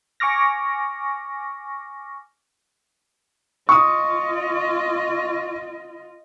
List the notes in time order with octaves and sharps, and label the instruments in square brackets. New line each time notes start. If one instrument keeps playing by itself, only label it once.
[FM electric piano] G#5 C#6 D6 F6 A#6
[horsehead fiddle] F4 D#5 [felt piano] C#6 D#6